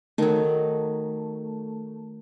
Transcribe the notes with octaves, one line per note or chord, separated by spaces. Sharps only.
D#3 F#3 A3